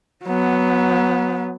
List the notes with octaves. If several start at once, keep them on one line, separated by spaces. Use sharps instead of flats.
F#3 B3